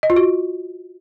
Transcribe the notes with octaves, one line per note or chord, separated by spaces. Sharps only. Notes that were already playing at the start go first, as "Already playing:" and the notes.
D#5
F4
F#4